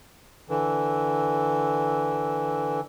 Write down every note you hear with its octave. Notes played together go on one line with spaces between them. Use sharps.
D3 E3